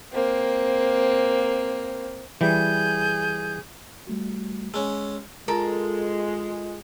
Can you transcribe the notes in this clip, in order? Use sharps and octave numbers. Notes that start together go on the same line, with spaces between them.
A#3 C4
E3 G3 G#4 G6
G3 A3 F#4
G#3 C#4 E6
G#3 F4 A4 A#4